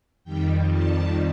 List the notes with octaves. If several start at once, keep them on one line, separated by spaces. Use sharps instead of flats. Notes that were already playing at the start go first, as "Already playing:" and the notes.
F2 D#3 G3 G5
A5